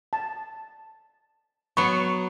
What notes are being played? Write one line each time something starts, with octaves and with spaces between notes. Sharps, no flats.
A5
F#3 B3 C#6